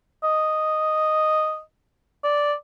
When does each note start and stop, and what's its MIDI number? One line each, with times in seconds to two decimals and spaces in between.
0.23 1.61 75
2.24 2.54 74